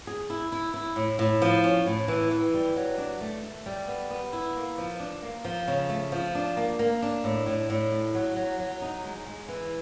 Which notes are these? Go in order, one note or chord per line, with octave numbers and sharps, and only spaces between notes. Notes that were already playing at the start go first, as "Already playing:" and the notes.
G#4
E4
E4
E4
A2
A2
F3
C#4
A2
E3
E3
G3
F#3
D4
A3
A3
G3
B3
B3
E4
A#3
F3
D4
A#3
F3
C#3
A3
F3
D4
A#3
A#3
D4
A2
A2
A2
A3
F#3
F#3
F#3
D#4
G#3
G#3
E3